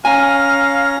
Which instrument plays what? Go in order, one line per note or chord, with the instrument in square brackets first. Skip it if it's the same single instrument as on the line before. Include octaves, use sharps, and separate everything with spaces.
[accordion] C#4 A#5 [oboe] F5 [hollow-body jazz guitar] G#5